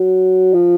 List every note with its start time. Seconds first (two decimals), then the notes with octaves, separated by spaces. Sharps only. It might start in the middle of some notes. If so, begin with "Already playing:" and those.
Already playing: F#3
0.53 F3